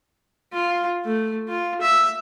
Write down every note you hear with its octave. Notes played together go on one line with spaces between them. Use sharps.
F4
A3
F4
E5